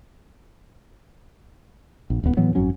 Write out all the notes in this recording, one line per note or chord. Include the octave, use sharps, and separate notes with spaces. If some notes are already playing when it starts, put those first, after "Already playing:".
A#1
D#1 C#2 A#3 B3
A2 E3 F#3 B3
G#1 F#2 F#3 C#4